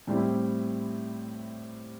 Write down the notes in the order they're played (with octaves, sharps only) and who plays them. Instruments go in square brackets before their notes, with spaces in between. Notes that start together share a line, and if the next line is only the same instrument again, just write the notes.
[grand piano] A2 G3 C4 E4 G4